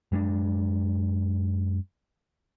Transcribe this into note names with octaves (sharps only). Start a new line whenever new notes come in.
F#2 G#3 C4 D4